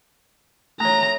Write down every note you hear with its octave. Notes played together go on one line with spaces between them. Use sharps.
A3 C#5 A#5